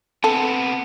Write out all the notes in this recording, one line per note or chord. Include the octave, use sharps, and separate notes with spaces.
C3 B3 A4